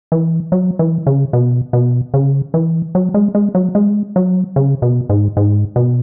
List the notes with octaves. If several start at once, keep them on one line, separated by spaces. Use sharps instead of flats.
E3
F#3
E3
C#3
B2
B2
C#3
E3
F#3
G#3
G#3
F#3
G#3
F#3
C#3
B2
G#2
G#2
B2